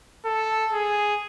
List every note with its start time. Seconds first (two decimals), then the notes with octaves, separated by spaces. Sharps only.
0.25 A4
0.73 G#4